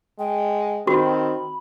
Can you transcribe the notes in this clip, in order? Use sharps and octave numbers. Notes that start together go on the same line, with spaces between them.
G#3 G5
D#3 C4 F#4 B5